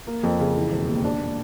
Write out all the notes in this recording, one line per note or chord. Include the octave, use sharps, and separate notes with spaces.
A#3
F2
C#3
E3
E1
D#2
D4
A#2